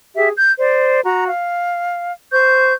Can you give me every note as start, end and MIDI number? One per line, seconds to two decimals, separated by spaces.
0.16 0.30 67
0.16 0.30 68
0.16 0.30 76
0.36 0.52 91
0.59 1.01 72
0.59 1.01 74
1.04 1.27 66
1.04 1.27 82
1.28 2.11 77
2.31 2.73 72
2.31 2.73 85
2.31 2.73 91